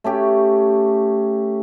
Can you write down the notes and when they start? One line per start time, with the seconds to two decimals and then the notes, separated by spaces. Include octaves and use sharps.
0.04 A3 C#4 G4